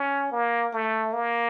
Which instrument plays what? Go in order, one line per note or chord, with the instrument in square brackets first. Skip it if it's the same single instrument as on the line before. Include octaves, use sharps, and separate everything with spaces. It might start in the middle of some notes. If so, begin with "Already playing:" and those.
Already playing: [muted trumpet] C#4
A#3
A3
A#3